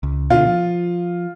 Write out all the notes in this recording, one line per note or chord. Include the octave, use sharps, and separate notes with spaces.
C#2
B2 D3 F4
F3